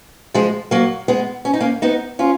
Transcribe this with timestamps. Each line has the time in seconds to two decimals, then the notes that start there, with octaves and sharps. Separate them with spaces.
0.34 F3 G#3
0.71 F#3 A#3
1.08 G#3 B3
1.45 C#4
1.54 D#4
1.61 A#3 C#4
1.82 B3 D#4
2.19 C#4 F4